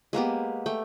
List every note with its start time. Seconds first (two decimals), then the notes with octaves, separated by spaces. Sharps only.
0.13 G#3 A#3 B3 G4
0.66 A3 G5